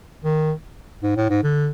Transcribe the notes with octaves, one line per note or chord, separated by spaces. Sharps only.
D#3
G#2
A2
G#2
D3